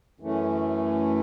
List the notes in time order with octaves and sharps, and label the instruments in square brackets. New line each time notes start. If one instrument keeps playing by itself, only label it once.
[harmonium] F#2 E3 A3 C#4